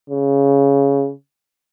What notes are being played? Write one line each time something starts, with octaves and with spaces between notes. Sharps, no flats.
C#3